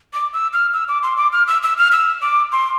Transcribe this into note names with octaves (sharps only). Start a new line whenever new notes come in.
D6
E6
F6
E6
D6
C6
D6
F6
E6
E6
F6
E6
D6
C6